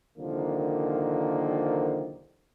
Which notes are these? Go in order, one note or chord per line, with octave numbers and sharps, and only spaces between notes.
C2 D3 D#3 F3 A#3